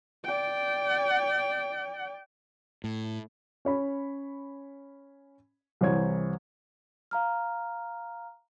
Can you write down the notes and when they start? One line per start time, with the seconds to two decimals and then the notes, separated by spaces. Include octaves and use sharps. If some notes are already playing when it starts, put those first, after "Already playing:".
0.24 D5 G5
2.84 A2
3.65 C#4 C#5 B5
5.81 C2 E3 C5 C#5 G#6
7.11 F5 A#5 F6